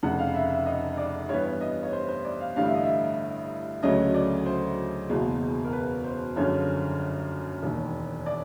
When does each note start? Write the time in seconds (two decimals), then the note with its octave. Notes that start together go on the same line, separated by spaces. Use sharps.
0.03 F1 F2 C#3 F#5
0.19 F5
0.34 E5
0.50 E5
0.66 D#5
0.97 D5
1.29 G2 E3 G3 B3 C#5
1.45 C#5
1.61 D#5
1.83 C#5
1.93 C5
2.09 C5
2.25 D5
2.40 F5
2.56 A1 G2 D3 F5
2.65 E5
2.75 D#5
2.83 E5
3.83 D2 C#3 F#3 A3 C#4 D#5
4.14 D5
4.46 C5
5.09 F#1 E2 B2 G#3
5.64 A#4
5.73 B4
6.04 C5
6.36 G1 F#2 D3 F3 G#3 C#5
7.62 E1 D#2 D#3
8.26 D5